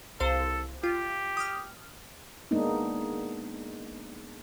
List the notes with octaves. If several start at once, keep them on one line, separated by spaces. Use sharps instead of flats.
C2 A4 C5 F5
F4 G4
D#6 F6
G#3 A#3 B3 D4 D#4